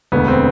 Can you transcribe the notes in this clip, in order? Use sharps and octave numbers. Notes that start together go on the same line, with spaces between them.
E1 D2 D3 B3
C4